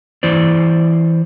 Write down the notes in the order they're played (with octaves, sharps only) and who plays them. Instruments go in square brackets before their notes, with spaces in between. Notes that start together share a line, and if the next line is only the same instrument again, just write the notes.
[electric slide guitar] E3 E4 C5 D5